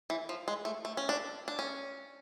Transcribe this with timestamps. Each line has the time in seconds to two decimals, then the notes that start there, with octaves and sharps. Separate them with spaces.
0.10 E3
0.29 F3
0.48 G#3
0.65 A3
0.85 A3
0.97 C#4
1.09 D4
1.48 D4
1.59 C#4